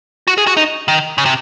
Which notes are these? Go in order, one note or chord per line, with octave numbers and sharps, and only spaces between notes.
F#4
G#4
F#4
D#4
D#3
C#3
C3